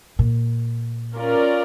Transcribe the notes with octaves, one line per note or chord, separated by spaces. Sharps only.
A#2
C#4 F4 A#4 D5